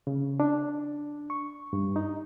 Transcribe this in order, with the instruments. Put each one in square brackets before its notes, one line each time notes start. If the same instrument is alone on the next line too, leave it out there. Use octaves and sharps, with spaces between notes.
[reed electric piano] C#3
D4
C#6
G2
D#4